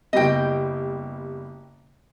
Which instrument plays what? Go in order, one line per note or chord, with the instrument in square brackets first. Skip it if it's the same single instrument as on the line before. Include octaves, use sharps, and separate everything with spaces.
[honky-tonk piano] F#1 G3 B3 [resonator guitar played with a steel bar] D#5 G5